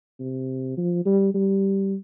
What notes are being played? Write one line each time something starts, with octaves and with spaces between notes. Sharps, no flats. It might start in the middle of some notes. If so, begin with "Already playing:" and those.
C3
F3
G3
G3